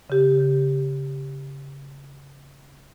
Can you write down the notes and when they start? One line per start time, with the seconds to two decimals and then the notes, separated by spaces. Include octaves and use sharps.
0.10 C#3 G4